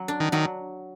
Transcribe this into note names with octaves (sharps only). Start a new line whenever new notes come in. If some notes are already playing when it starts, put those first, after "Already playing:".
Already playing: F#3
D4
D#3
D#3 F#3